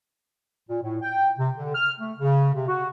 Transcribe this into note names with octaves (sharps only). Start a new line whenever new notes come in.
A#2
A2
G5
C3
D3
F6
A3
C#3
C3
F#4